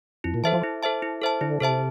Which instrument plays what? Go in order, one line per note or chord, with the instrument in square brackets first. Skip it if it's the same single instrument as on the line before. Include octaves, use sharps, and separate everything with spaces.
[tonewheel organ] F2 [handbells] E4
[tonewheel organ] A#2
[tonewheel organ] E3 [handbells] A4 C5 E5 A5
[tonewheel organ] F3
[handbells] E4
A4 C5 E5 A5
E4
A4 C5 E5 A5
[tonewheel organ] D3 [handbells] E4
[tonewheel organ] C3 [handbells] A4 C5 E5 A5